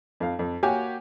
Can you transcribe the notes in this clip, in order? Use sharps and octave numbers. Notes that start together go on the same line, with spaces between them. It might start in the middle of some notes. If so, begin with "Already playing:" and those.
F2 F5
F2
A#3 F#4 G4 C#5 G#5